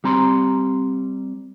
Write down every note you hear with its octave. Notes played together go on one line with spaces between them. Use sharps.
G3 C4 A#5 C6